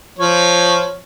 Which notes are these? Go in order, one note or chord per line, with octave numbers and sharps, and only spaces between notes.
F3 C#5